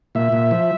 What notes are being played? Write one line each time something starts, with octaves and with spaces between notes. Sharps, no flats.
A#2 E5
A#2
F3